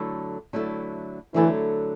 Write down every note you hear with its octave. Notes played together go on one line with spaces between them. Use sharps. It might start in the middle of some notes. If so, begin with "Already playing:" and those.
Already playing: D3 F#3 A3 E4 A4
D3 F#3 A3 E4 A4
D3 E3 F#3 A3 E4 A4